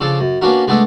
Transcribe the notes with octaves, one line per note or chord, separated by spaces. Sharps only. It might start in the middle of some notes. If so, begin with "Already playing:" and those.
C#3 F3 D4 A4
F#2
A#3 B3 C#4 D4 F#4 A#4
G#3 A3 B3 D4 A4 D#5